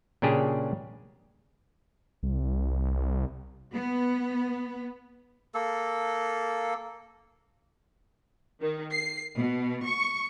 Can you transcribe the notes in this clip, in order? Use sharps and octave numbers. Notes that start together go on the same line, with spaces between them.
A#2 C#3 D4 G4 G#4
C2
B3
A#3 A4
D#3
C7
B2
C#6